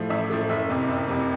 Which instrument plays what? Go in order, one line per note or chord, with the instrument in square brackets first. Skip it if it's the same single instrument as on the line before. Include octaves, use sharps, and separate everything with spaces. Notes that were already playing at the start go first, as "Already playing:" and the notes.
Already playing: [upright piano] A2 F3 A3
A1 E5
A2 F3 A3
F#1 E5
F2 C3
F#1
F2 C3